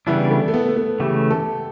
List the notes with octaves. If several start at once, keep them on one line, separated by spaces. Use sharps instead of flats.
C#3 E3 G3 B3 D4 E4
A3
A3
B3
A3
B3
C#3 E3 A3 G4
A4